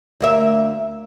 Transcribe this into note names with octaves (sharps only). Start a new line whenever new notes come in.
D2 A#3 E5